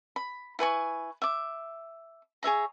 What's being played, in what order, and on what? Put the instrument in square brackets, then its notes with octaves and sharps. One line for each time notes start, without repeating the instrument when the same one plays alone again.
[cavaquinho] B5
E4 B4 G#5 C#6
E5 D6
G#4 C#5 E5 A#5